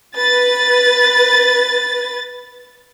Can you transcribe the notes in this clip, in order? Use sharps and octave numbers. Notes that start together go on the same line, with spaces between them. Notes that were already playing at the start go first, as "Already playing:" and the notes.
B4 A6